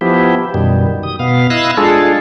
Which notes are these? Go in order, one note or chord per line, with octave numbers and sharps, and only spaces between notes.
F3 B3 E4 G4
F#2 B2 D#3 G3
D#6
B2 B3 F5
E4 D#5 F5 E6 F#6
G#3 D4 F4 G#4 A4